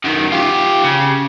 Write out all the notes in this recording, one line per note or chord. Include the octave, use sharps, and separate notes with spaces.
F#2 D#3
F4 G4
C#3